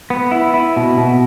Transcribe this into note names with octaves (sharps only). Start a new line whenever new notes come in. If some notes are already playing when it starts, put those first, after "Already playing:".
B3
E4
E4
B2
B2